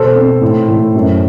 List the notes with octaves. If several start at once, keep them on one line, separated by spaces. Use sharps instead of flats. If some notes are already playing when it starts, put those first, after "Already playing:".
Already playing: B2 A4 C5
C4
A2
A2
F#2